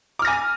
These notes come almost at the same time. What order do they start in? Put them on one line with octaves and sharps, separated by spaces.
D6 F6 A#6 G#5